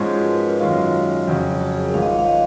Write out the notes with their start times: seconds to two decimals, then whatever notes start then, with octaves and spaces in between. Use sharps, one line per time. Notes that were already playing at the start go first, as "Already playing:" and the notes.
Already playing: G#2 F3 G#3 C#4 G#4
0.10 F#4
0.19 B4
0.27 A#4
0.38 B4
0.49 F4
0.60 F#2 D#3 G#3 C#4 F4 F#4
1.27 F2 C#3 F#3 C#4
1.60 F#4
1.72 G#4
1.83 A#4
1.94 G#1 G#2 F3 F5
2.02 D#5
2.11 C#5
2.19 F5
2.27 D#5